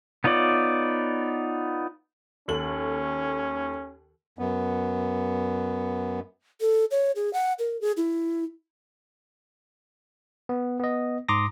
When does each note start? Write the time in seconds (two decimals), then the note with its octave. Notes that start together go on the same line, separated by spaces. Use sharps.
0.24 B3 D#4 F4 C#5 D5
2.48 D#2 C#4 A4 F#7
4.39 F#2 B3
6.61 A4
6.91 C#5
7.16 G#4
7.33 F#5
7.59 A#4
7.81 G#4
7.97 E4
10.49 B3
10.80 B3 D#5
11.28 G#2 A#5 C6 D6 D#6 A#6